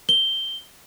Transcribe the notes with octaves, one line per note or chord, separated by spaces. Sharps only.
G7